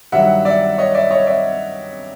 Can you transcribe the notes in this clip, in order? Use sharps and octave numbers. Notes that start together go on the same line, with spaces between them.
G2 D#3 F#3 E5 F#5
D5 E5
C#5 D#5
D5 E5
C#5 D#5
D5 E5